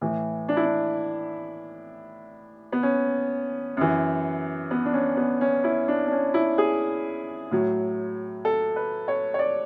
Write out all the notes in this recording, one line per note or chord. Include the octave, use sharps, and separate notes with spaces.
A2 E3
D4
E4
D4
B3
C#4
F#2 E3
B3
D4
C#4
B3
C#4
E4
D4
D4
C#4
E4
G#4
A2 F#3
A4
B4
C#5
C#5
D5